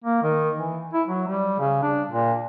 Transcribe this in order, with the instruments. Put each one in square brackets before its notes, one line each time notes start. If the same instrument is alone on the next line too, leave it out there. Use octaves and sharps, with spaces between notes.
[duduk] A#3
D#3
E3
E4
F#3
G3
C#3
D4
A#2